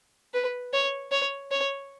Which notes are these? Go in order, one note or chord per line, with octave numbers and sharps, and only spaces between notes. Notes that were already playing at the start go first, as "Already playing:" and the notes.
B4
C#5
C#5
C#5